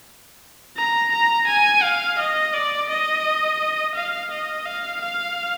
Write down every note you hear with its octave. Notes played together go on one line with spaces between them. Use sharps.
A#5
A#5
G#5
F5
D#5
D5
D#5
F5
D#5
F5
F5